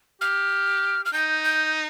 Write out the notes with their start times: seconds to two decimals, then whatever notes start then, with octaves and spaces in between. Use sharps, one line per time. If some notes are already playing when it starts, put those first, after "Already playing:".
0.21 G4 F6
1.05 F6
1.13 D#4 G6
1.44 G6